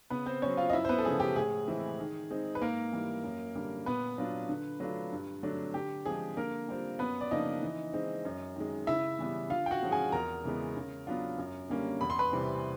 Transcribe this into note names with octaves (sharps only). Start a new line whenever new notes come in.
C#3 B3 B4
C4 C5
F#3 B3 C#4 C#5
F4 F5
D#5
F#2 E4 E5
C5
B3 B4
A4
C#3 F3 G#3 C#4 G#4
G4
A2 G#4
E3 G#3 C4 E4
D#3
G#3 C4 D#4
B4
G#2 A#3 A#4
E3 G3
F#2
D3 G3 A#3
A#2 B3 B4
F#3 B3 D4 F4
D3
F#3 A3 D4 F4
G2
D3 F#3 A3 D4
D3 G4
F3 G#3 G#4
D3 A#3 A#4
G3 C4 F4
F#2 B3 B4
D5
C#3 F3 A#3 D4 D#4 D#5
E3
G#3 C4 D#4
F#2
D#3 G#3
C#3 E4 E5
E3 G3 B3 E4
D3 F4 F5
G5
F#4 F#5
F3 G#3 C#4 E4
G#4 G#5
E2 A#4 A#5
C#3 E3 G#3 B3
C#3
F#3 B3 D4 F4
F#2
D3 G3 A#3 C#4
E2 B5
C6
B4 B5
C3 E3 G3 C4